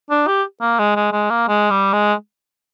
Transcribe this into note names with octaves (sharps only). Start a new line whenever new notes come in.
D4
G4
A#3
G#3
G#3
G#3
A#3
G#3
G3
G#3